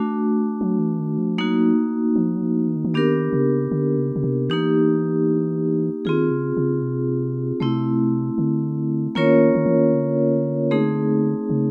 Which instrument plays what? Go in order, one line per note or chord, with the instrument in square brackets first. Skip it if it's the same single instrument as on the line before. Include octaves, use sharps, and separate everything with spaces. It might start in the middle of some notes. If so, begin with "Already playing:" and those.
Already playing: [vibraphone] A3 D4 F#4
[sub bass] F#3
E3
D#3
F3
[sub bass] F#3 [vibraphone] A#3 D#4 F#4
[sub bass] F3
F#3
F3
E3
D#3
E3
[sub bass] D#3 [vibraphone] B3 D4 G4 A#4
[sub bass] C#3
D3
C#3
C#3
C3
[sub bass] E3 [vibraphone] A#3 D#4 G4
[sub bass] D#3 [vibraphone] C4 F4 G#4
[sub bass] C#3
C#3
C3
[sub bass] C3 [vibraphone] A3 C4 E4
[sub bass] D3
[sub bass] D#3 [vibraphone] A#3 C#4 F4 A#4 C#5
[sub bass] D#3
E3
D#3
D3
[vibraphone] A3 C4 D#4 G#4
[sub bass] C#3